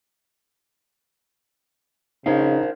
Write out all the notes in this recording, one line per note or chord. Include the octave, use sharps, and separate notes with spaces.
C#3 D#4 A#4 C5 F5